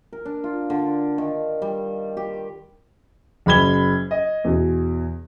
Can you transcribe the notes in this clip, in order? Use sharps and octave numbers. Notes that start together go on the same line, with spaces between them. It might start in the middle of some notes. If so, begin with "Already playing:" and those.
A#4
D4
F4
D3
D#3
G3
G4
F#1 F#2 B5 G#6 G7
D#5
E2 B2